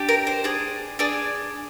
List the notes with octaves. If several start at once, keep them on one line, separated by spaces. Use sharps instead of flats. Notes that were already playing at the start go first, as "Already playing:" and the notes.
Already playing: D4 G4
A#4
C5
D4 G#4
D4 G#4 D5